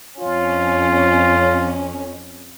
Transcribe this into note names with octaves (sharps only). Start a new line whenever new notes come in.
F2 C#4 F4